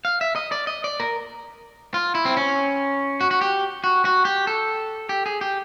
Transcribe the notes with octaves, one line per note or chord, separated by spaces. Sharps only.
F5
E5
D#5
D5
D#5
D5
A#4
F4
E4
C4
C#4
F#4
F#4
G4
F#4
F#4
G4
A4
G4
G#4
G4